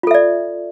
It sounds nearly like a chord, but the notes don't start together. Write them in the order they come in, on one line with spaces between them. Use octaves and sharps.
F4 A4 E5 D5